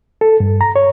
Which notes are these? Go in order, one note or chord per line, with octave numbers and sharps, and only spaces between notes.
A4
G2
A#5
C#5